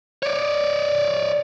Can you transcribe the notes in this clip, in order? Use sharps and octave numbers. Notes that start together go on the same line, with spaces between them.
C#5 D5